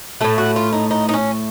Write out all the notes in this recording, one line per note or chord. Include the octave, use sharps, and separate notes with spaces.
A2 A3 A4
F#4
F4
D#4
D#4
D#4
C#4